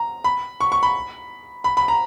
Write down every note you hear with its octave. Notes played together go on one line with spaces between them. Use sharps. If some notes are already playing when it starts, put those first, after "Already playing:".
Already playing: A#5
B5
C#6
C#6
B5
B5
B5
A#5